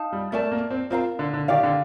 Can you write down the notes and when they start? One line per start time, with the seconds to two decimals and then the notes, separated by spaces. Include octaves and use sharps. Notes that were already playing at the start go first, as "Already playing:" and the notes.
Already playing: D#4 F5 A5
0.12 G3
0.32 A3 A#4 D5 A5
0.52 A#3
0.70 C4
0.90 C4 F4 A#4 F5 A#5
1.19 D3
1.34 D3
1.48 D#3 G4 D5 F5
1.63 D3